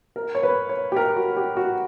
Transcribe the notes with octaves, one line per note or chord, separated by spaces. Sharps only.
A#4
C#5
B4
C#5
G4
A#4
F#4
G4
F#4